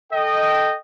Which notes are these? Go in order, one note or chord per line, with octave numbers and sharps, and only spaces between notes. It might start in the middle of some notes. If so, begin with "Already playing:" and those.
A4 D#5 G5